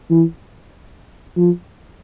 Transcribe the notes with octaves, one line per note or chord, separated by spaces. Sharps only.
E3
F3